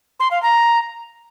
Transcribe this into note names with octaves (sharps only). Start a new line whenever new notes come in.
C6
F5
A#5